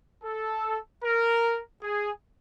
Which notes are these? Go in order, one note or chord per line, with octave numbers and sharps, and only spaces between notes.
A4
A#4
G#4